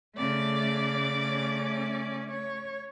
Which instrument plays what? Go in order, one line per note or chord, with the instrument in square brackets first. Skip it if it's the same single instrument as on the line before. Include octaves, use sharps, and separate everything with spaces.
[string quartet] C#3 D5 D6 [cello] A3
[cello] A3 C#4
C#5